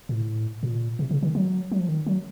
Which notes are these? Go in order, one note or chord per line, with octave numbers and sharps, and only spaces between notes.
A2
A#2
C3
C#3
D#3
F#3
F#3
F3
D#3
F#3